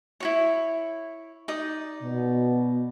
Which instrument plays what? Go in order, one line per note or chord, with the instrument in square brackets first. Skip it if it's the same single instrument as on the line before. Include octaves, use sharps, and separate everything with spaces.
[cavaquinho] E4 F#4 C#5
D#4 D5 D#6
[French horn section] B2